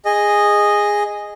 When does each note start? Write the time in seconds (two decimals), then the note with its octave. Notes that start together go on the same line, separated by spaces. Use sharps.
0.05 G#4 D#5